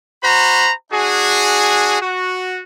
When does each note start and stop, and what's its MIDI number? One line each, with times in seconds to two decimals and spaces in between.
0.22 0.70 66
0.22 0.70 72
0.22 0.70 82
0.22 0.70 83
0.91 2.00 62
0.91 2.00 66
0.91 2.00 68
2.00 2.61 66